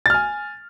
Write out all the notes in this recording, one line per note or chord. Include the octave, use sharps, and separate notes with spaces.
G#5 F6 A6